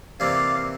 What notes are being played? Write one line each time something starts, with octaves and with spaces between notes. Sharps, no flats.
C3 E3 A#3 D5 F5